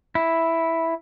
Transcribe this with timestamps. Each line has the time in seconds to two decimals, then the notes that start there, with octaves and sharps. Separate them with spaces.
0.15 E4